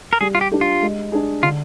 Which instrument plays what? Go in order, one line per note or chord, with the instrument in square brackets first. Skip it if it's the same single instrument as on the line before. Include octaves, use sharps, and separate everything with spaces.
[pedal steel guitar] A#4
[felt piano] G3 [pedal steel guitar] G#4
[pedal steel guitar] F4
G4
[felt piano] D4 G4
[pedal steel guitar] F4
[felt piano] G#3
D4 G#4
[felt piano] D3 [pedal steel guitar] F4